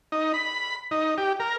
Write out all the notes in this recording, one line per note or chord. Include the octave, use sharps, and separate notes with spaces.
D#4
B5
D#4
G4
A#4